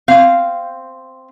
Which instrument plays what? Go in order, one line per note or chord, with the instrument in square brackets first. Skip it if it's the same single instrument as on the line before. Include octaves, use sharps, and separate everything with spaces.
[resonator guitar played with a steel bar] C4 F5